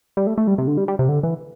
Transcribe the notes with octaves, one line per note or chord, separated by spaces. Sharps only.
G3
A3
A3
G3
C3
D3
G3
G3
C3
D3
E3